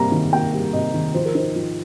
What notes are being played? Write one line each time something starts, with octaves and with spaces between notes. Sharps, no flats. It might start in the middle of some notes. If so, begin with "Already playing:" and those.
Already playing: C3 G3 A#3 A#5
D#3
A#3 G5
G3
C3 D#5
D#3
F3 C5
A#4
D#4 C5
F3